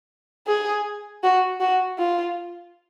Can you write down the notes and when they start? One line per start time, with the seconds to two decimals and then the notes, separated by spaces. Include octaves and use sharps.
0.47 G#4
1.23 F#4
1.60 F#4
1.99 F4